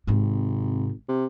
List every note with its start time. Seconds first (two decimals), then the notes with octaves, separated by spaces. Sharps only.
0.07 G#1 G#2 C3
1.09 C3